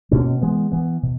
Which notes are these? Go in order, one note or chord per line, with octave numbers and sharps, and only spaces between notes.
B2 A#3 C#4
E3 G#3 B3
E3 B3
B2